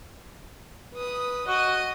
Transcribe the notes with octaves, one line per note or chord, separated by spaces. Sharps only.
B4 D#6
F#4 D#5 D#7